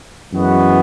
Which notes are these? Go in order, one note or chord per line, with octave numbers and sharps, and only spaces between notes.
F#2 E3 G#3 B3 F#4